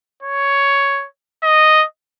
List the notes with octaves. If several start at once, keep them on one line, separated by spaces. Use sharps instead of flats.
C#5
D#5